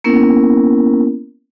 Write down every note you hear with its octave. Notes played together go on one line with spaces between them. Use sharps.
A#3 B3 C#4 E4 A#4